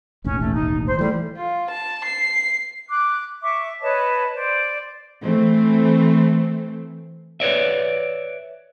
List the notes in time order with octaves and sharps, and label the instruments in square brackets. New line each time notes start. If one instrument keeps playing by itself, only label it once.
[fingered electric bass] E1 A1 D#2 [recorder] C#4
[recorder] A3
D#4
C5
[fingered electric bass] E3 A3 [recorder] G3
[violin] F4
A5
C7
[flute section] D6 F#6
E5 C#6 D6
B4 C#5 D#5 A5
C5 D5
[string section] E3 A3 C4
[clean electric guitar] B4 C#5 D5 E5